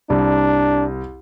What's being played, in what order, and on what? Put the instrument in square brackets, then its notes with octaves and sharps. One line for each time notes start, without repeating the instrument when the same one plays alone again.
[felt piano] C2 [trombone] D4